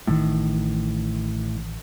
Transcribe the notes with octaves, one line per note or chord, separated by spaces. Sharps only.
A1 A2 D#3